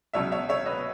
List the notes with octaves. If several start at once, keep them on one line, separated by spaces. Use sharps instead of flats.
C#2 B2 F#3 C#4 C#5 E5
C#5 E5
C#5 E5
B4 D#5